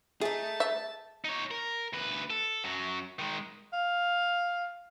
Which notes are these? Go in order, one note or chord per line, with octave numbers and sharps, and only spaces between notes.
A3 D#4 G#4 A5
E5
D#4 C#5
A#4
D2 B4
A4
F#2 F#3
D#3 G#3
F5